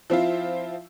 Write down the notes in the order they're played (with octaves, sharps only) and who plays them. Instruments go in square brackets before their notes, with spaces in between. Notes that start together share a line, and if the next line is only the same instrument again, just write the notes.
[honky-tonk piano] F3 C4 E4 F4